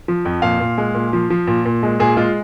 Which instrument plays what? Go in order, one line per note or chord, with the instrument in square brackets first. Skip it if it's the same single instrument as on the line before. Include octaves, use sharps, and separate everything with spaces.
[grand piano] F3
F2
A#2 F5
A#2
G#3
A#2
F3
F3
A#2
A#2
G#3
A#2 G#4
G#3 F4